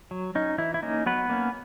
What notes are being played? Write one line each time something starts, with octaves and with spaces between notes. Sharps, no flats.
F#3
C#4 D#4
E3 E4
E4
A#3 C#4 D#4
F#3 B3 B4
A#3 C#4